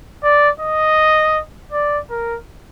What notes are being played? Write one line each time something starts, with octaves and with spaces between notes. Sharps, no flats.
D5
D#5
D5
A#4